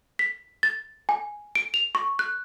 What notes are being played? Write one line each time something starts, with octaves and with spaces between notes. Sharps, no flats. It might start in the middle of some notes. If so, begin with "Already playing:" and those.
B6
A6
G#5
D7
F7
C#6
F#6